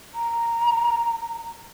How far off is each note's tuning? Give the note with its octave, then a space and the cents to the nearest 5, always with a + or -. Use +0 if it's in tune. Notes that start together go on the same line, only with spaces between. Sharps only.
A#5 -5